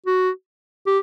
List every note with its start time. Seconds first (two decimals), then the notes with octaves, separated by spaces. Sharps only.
0.06 F#4
0.87 G4